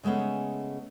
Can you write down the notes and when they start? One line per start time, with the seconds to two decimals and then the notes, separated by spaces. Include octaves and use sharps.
0.03 C#3 G#3 A3 B3 C#4